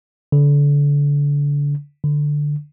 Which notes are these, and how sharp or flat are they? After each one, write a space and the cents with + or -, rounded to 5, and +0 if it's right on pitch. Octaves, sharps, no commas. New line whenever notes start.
D3 -30
D3 +5